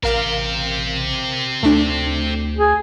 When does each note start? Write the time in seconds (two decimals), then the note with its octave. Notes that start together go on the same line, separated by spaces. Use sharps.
0.03 A1 C4 G4 A#4 F5
1.63 D2 A3 D4
2.57 G#4